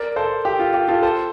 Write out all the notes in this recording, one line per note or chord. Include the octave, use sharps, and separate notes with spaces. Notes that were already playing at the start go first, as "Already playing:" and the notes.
Already playing: A#4 D5
A4 C5
G4
F4
G4
F4 A4
A4 C5